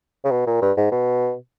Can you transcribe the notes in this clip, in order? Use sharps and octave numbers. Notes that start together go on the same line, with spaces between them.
C#3
B2
A#2
G2
G#2
B2